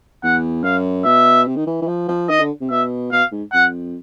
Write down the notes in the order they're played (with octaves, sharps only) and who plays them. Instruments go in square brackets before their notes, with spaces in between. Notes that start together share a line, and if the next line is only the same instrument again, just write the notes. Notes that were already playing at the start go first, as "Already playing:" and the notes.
[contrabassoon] E2 [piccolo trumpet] F#5
[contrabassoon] F#2 [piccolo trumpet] F5
[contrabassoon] B2 [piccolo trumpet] E5
[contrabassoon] C3
D#3
E3
E3
F3
F3
[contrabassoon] D#3 [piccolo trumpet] D#5
[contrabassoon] D3
C3
[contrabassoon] B2 [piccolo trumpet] E5
[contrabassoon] B2 [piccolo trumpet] F5
[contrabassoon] G#2
[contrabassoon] F2 [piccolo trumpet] F#5